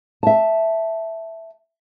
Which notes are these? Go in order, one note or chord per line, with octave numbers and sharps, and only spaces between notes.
E5 A5